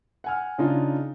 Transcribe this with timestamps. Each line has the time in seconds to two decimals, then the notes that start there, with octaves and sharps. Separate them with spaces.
0.24 F#5 G#5 F6
0.58 C#3 D4 D#4 F4